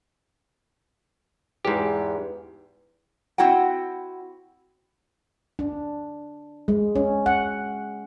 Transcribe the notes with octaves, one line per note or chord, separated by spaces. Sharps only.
E2 G#2 G4
C4 E4 F#4 F#5 G5
D4
G#3
C#4
F#5